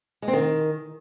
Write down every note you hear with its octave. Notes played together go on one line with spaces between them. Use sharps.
G#3
C4
D#3